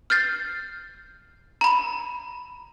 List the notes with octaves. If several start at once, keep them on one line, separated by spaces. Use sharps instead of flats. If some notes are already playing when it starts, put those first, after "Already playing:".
F6 G6 A6 C7
A#5 B5